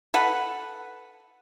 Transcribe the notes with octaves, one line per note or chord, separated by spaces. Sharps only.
A4 B4 F#5